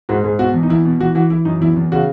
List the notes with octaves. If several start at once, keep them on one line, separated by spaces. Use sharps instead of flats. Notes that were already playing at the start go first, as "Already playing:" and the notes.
G#2 F#4
G#2 G#4
B2 F#4
E2
D#4
E2 E4
B2
E3 F#4
E3 F#4
E3 E4
F#2 D#4
E2 E4
E2
C#3 F#4